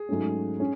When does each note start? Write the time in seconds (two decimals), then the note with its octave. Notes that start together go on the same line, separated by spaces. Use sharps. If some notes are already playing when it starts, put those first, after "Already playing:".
Already playing: G#4
0.09 G#2 F#3 A3 C#4
0.60 C#4